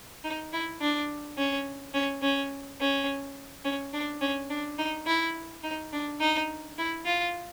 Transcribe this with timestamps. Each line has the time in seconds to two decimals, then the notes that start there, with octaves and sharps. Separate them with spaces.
0.24 D#4
0.53 E4
0.81 D4
1.38 C#4
1.94 C#4
2.22 C#4
2.80 C#4
3.65 C#4
3.93 D4
4.21 C#4
4.50 D4
4.78 D#4
5.07 E4
5.64 D#4
5.93 D4
6.20 D#4
6.78 E4
7.06 F4